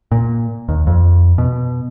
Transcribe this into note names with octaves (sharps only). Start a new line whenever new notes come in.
A#2
D#2
F2
B2